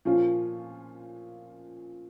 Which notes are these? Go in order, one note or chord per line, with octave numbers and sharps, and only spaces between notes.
A#2 F3 C#4 F4